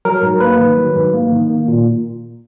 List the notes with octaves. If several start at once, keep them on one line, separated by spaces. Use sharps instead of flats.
F#3 A#4
G#2
A#3 B4
D#3
F#3
G#2
A#3
D#3
A#3
A#2